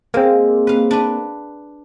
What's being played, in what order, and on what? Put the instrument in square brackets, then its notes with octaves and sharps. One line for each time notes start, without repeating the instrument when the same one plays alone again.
[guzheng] G#3 [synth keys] A#3 C4
[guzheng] B4 F5
D4 B4